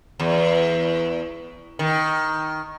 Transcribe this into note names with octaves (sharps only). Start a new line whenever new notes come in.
E2
D#3